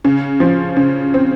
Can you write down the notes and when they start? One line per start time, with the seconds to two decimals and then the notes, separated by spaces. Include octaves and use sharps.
0.04 C#3
0.40 F3
0.77 C#3
1.14 C4